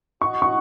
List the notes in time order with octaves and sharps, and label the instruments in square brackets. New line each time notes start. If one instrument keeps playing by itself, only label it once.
[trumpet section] F#4 D#5 F#5 [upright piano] C#6
[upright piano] C#6